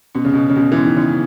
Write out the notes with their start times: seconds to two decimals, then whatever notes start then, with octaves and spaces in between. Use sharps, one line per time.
0.15 B2 C#4
0.25 C#3
0.34 B2 C#4
0.50 C#3
0.55 B2 C#4
0.72 E3 C#4
0.85 D#3
0.96 C#3 C#4